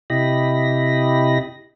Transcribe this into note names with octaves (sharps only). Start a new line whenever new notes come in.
C3 E4 G4 D#5 B5 A#6